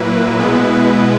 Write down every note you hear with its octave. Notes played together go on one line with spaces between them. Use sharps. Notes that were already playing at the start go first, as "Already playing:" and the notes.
Already playing: A#2 F#3 A#3 E4 B4
B2 G#3 B3 E4